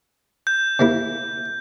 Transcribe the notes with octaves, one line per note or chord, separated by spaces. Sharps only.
G6
C3 A#3 E4